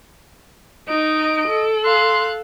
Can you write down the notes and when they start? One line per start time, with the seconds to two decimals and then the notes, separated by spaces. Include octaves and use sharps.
0.89 D#4 D#5 D7
1.48 A4
1.85 F5 C6 F#6